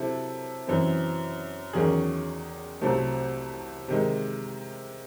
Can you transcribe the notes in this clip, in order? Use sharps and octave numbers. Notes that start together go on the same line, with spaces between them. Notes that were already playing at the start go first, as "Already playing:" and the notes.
Already playing: C3 F#3 C4 E4 A4
F#2 E3 C4
E2 D#3 F#3 C#4 G#4
C2 C3 F#3 A3 C4
C3 D#3 G#3